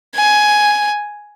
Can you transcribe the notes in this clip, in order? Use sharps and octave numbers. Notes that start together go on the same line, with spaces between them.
G#5